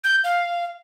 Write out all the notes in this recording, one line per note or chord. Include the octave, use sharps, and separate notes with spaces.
G6
F5